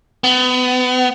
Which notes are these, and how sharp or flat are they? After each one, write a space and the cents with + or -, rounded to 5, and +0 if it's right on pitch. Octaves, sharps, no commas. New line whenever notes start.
B3 +30